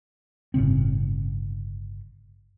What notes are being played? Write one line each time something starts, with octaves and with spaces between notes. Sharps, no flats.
G1 A2 C#3 C4